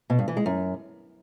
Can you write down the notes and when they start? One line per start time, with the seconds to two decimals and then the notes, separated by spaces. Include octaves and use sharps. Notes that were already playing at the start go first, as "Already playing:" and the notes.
0.10 B2
0.19 G2
0.28 E3
0.37 G#3
0.46 F#2